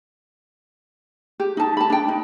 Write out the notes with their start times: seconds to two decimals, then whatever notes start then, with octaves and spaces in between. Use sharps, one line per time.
1.40 G4
1.57 D#4 A5
1.77 A5 B5
1.90 D4 G5
2.09 D#4